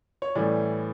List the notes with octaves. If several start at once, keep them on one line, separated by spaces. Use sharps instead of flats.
C#5
A2 E3 G3 C#4 D5